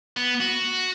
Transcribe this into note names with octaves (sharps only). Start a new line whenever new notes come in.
B3
F#4